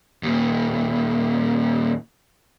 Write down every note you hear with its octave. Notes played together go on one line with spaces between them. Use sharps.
D#2 A#2